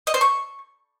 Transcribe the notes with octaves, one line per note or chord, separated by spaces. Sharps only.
D#5
C5
C#6